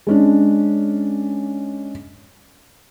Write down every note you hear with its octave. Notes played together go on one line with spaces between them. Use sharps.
G#3 C#4 D4